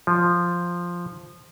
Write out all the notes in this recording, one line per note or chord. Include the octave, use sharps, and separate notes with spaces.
F3